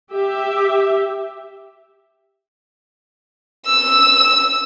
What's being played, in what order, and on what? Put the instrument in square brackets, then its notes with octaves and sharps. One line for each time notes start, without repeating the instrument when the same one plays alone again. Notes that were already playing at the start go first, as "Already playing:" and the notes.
[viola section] G4 E5
[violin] E6